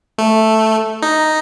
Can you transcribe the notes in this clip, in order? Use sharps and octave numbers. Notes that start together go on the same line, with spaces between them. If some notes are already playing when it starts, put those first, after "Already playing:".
A3
D#4